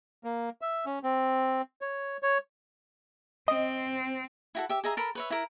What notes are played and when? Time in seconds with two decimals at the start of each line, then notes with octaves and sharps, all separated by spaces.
0.24 A#3
0.62 E5
0.86 C#4
1.03 C4
1.81 C#5
2.23 C#5
3.48 C4 D#5
4.55 E4 F#4 A4
4.69 G4 E5
4.84 G#4 D#5 E5 A#5
4.97 A4 A#4 B5
5.15 B4 C#5 E5
5.30 E4 A#4